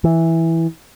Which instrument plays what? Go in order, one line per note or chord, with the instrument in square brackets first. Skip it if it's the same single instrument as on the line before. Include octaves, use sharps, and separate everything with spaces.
[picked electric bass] E3